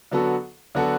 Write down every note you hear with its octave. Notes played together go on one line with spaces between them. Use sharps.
D3 F#3 B3 F#4 A4
D3 F#3 B3 F#4 A4